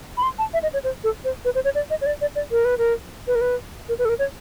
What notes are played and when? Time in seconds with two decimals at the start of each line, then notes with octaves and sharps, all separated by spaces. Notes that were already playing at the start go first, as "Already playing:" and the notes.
0.17 B5
0.23 C6
0.38 A5
0.53 E5
0.63 D#5
0.73 C#5
0.84 C5
1.04 A4
1.25 C5
1.45 B4
1.55 C5
1.65 C#5
1.75 D5
1.90 D#5
2.01 C#5
2.06 D5
2.21 D5
2.36 D5
2.52 A#4
2.65 B4
2.78 A#4
3.27 B4
3.35 A#4
3.41 B4
3.89 A#4
3.99 B4
4.05 A4
4.09 A#4
4.19 C#5